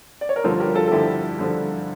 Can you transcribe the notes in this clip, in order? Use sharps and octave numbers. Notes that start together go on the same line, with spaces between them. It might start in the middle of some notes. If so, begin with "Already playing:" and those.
D5
C#5
A#4
G2 D3 F3 F4 A4
G4 A#4
F4 A4
A4
G2 D3 F3 E4 G4
G2 D3 F3